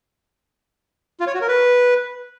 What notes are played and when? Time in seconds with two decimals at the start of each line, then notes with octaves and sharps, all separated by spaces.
1.20 F4
1.27 C#5
1.34 F#4
1.41 A#4
1.48 B4